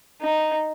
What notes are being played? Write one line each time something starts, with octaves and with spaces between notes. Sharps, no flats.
D#4